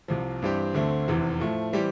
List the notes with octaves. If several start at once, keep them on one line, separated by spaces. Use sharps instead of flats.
C2 C3 F3
G2 E3 G3 C4 G4
D2 D3 A3 C4
F1 E2 C3 E3
A2 F3 A3
E3 G3 C4 G4